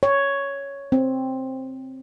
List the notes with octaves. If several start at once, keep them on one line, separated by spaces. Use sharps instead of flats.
C#5
C4